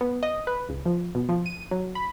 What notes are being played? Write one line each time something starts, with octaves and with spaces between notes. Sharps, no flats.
B3
D#5
B4
C#2
F3
B2
F3
D#7
F#3
B5